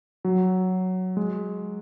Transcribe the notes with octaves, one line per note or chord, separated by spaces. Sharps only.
F#3
G#3